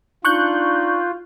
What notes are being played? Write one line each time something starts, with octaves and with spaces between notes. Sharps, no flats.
D4 D#4 F4 C#6 F#6 G6